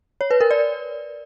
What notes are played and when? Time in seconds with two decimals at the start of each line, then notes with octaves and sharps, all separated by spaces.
0.21 C#5
0.31 B4
0.41 A#4
0.51 D5